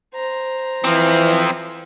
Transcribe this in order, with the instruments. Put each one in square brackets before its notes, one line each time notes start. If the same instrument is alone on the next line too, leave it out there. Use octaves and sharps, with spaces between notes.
[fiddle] C5 A#5
[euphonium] E3 [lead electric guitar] F3 C4